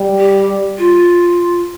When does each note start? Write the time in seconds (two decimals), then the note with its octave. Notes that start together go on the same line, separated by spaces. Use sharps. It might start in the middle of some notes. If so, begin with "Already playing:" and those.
Already playing: G3
0.19 G4
0.78 F4